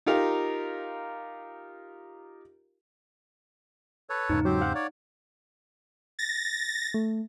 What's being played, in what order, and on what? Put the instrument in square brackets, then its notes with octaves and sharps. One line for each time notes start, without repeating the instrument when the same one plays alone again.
[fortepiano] D#4 F4 G4 A#4 F5
[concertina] A4 B4 C#5
[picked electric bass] E2 G#2 C#3 [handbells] D#4
[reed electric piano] F#3 [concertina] C4 G4 C5
[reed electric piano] F5 F#5
[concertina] C#5 D5
[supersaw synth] A6 A#6
[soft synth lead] A3